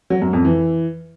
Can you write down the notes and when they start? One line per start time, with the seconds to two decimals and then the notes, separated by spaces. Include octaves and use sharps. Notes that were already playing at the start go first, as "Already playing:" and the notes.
0.10 F#3
0.22 F#2
0.33 F2
0.45 E3